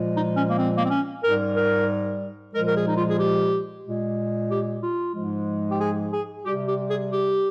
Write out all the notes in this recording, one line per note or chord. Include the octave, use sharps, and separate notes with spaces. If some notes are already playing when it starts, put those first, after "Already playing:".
Already playing: A#2 F3 G#3
D#4
C#4
A#3
C4
A#3
C4
C#4
G#2 G3 A#4
A#4
A#2 F3 G#3 A#4
A#4
G#4
D#4
F4
G#4
G4
A#2 G#3
G4
F4
G#2 F3 G#3
G4
G#4
G#4
C3 G3 G4
G4
G#4
G4